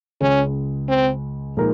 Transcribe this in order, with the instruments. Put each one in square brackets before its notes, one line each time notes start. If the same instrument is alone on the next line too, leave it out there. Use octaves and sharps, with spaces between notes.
[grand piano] C#2 C#3 G#3 [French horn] C#4
[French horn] C4
[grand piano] A#2 F3 G#3 D#4 A#4